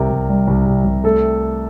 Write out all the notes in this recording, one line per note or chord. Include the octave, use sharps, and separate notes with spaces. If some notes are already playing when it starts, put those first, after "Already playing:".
Already playing: C2 C3 G3 A#4
C2
G3
C2
C3
C2
A3 A4